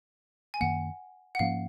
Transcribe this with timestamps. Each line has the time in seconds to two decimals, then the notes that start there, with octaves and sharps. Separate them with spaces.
0.54 G#5
0.61 F#2 D#3 A#3 F#5
1.35 F#5
1.39 G#2 F3 A#3 C#4 F5